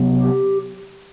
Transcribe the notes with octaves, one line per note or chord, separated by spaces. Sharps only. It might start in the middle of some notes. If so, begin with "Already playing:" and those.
Already playing: C3 F#3 B3
G4